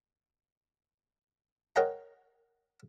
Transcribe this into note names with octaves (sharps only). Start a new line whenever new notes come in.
A#4 C#5 D#5 F#5 G5 A#5